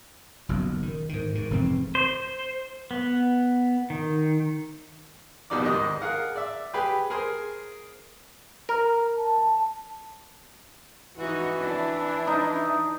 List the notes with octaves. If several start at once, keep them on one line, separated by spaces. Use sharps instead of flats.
F#1 B1 F#2
D#3
G#2 D#3
G#2 D#3
F1 G#2 E3 C4
C5
B3
D#3
A#1 B2 G3 D#4 D5 D6
D2 G#2 D#3 D#5
G#4 A#4 F5 F#5
D5 E5
G4 G#4 B4 G5
G#4 A#4 C5 G#5
A#4
A5
E3 D#4 F#4
D4 E4
D#4